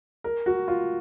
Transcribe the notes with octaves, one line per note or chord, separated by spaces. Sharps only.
A#4
F#4
F4